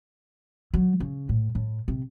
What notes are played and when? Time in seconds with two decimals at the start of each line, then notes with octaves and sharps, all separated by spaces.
0.74 F#3
1.00 C#3
1.29 A2
1.55 A2
1.88 C3